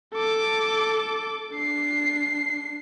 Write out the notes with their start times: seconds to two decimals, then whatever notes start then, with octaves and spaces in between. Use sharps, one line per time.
0.14 A4 D6
1.54 D4 C7